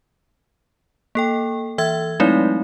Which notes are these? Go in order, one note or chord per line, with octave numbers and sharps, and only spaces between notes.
A#3 A4 G5
E3 E5 E6 G#6
F#3 G#3 A3 C4 D#4 E4